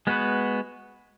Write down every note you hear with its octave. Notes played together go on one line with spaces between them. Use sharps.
G#3 B3 F#4 B4